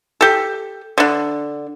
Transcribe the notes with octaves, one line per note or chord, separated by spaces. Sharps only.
G4 A4
D3 D4